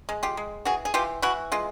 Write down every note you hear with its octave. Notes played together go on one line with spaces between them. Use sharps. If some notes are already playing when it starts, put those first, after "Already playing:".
G#3
F4 G4
G#3
E3 F#4 G#4
G#4
E3 F4 G4
E3 E4 F#4
G#3 F4